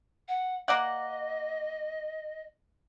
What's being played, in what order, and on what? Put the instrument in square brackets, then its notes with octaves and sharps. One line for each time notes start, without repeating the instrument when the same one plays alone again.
[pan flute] F#5
[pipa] A#3 D5 F#5 [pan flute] D#5